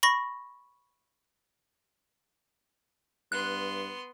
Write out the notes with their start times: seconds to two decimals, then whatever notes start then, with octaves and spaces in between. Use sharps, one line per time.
0.03 B5 C#6 A#6
3.32 G2 B3 C6 F#6